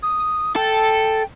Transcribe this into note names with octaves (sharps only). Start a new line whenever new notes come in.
D#6
A4 G5